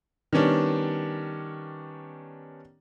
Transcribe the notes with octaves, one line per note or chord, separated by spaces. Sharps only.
D#3 G3 B3 C#4 D4